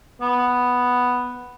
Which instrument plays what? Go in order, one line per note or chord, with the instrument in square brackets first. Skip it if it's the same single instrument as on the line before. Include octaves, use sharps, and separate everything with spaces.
[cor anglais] B3